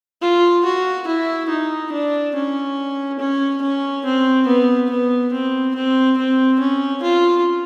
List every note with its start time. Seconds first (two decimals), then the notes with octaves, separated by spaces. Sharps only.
0.22 F4
0.65 F#4
1.07 E4
1.50 D#4
1.92 D4
2.35 C#4
3.20 C#4
3.62 C#4
4.05 C4
4.47 B3
4.90 B3
5.33 C4
5.75 C4
6.18 C4
6.60 C#4
7.03 F4